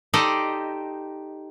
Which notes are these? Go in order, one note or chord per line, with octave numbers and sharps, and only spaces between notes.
D#4 G4 A4 C5 D5 D#5